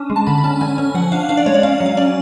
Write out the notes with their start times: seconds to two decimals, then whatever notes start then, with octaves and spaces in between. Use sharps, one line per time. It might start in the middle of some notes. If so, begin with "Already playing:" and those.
Already playing: C#4 D4
0.10 G#3
0.16 A5
0.27 D3 B5
0.38 B5
0.44 C#4 A5
0.61 D3 G#5
0.78 C#4
0.95 F3 F#5
1.12 D4 F5
1.29 D4 F5
1.37 D5
1.46 G#3 C#5
1.54 D5
1.63 C#4 F5
1.80 F#3
1.86 F5
1.97 C#4 D5